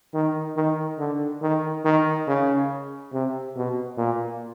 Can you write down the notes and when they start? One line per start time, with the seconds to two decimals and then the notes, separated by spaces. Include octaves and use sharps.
0.14 D#3
0.56 D#3
0.98 D3
1.42 D#3
1.85 D#3
2.28 C#3
3.13 C3
3.56 B2
3.97 A#2